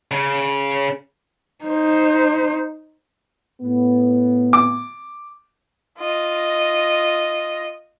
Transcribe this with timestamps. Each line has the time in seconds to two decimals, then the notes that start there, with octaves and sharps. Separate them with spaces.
0.11 C#3
1.65 D#4 C5
3.61 A2 B3
4.53 D6
5.98 F4 D#5